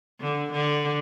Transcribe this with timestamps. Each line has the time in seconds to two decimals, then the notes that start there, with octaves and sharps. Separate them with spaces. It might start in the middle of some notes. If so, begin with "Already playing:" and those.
0.21 D3
0.53 D3